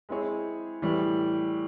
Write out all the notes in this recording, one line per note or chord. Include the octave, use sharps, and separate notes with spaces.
G#3 C4 E4 G#4 C#5
A2 E3 G3